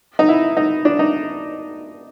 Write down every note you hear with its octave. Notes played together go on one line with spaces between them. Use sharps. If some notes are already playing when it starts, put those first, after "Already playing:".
D#4
E4
D#4
D4
D#4